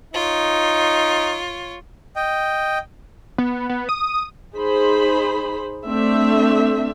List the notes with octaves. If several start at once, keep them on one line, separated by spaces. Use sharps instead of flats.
D#4 F4 C#5
D#5 G5
B3
B3
D#6
D#4 G#4 C5 B5
A3 C4 D4 E5